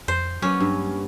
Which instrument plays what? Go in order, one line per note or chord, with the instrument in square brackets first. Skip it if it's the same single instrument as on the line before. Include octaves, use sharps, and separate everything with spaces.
[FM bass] F2 [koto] C5
[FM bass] F#3 [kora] A#3 B3 [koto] C#4
[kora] G2